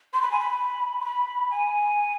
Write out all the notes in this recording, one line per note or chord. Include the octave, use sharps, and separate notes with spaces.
C6
B5
G#5
B5
C6
B5
G#5